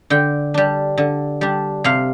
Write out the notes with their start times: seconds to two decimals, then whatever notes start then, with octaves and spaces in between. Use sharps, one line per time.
0.10 D3 G5
0.54 G3 D4
0.97 D3
1.41 G3 D4
1.84 C3 F5